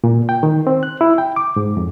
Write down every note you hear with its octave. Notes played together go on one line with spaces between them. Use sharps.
A#2
G5
D#3
C4
F#6
E4
G5
D6
G#2
F2